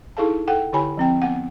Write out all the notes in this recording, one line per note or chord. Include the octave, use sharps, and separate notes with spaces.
D#4 E4 G#4 A4 F5 A5
A4 F#5 G5
D3 E4 G4 C#5 G#5 B5
F3 C4 G5
B3 F#5